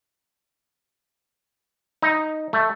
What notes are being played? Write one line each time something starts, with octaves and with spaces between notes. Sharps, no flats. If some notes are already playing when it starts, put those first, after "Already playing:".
D#4
A3